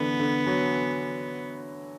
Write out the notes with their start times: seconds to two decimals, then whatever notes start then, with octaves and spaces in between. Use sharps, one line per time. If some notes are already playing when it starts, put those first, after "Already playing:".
Already playing: D3 E3 B3
0.20 D3
0.46 F#3